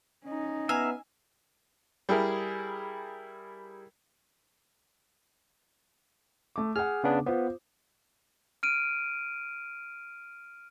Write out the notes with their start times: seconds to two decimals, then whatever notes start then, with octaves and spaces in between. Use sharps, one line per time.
0.25 C#4 D#4
0.69 B3 E5 F5 G#5 A#5
2.09 G3 E4 G#4 A#4
6.56 A3 D6
6.76 G#4 F#5 F6
7.04 C#3 B3 D4
7.26 B3 F4 C5
8.63 F6 D7 D#7